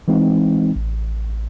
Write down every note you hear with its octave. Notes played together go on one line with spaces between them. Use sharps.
E3 G#3 C4 D#4
A1